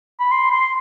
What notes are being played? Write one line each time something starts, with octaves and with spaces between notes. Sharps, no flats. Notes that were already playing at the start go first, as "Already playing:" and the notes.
B5
C6
C6